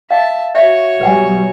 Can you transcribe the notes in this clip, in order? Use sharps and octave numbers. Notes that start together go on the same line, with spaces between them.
E5 F5 A5
F#4 C#5 E5
B2 F#3 G3 B4 F#5 G#5